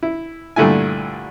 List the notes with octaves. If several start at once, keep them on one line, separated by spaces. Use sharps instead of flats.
E4
G2 A#2 D3 A3 E4 G#5